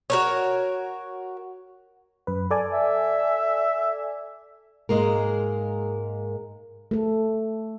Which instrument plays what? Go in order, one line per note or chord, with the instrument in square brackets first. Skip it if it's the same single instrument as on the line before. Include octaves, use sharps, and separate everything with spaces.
[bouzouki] F#4 A#4 C#5
[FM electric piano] F#2 B4
A4 D5 G#5
[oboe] E5
[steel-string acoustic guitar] G#2 G#3 A#3 A#4
[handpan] A3 A4